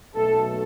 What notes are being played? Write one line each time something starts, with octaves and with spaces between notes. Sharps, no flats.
B1 B2 A3 A4